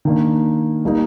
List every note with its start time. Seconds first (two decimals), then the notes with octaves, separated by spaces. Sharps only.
0.05 D#3 A#3 D4
0.85 G3 A#3 D#4